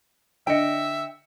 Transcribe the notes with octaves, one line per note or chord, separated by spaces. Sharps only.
D3 D#5 E5 G5 C#7